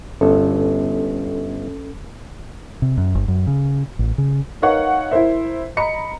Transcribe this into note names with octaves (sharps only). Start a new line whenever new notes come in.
G1 C#4 A4
C3
F#2
G1
F#2
C#3
A1
C#3
D#4 A#4 B4 C#5 F5 F#5
E4 A#4 C5 E5
D#5 A#5 B5 C#7